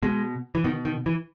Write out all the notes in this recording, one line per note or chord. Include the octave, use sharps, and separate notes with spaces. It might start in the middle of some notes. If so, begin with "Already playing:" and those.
B2 G#3
E3
B2 D#3
D#3
E3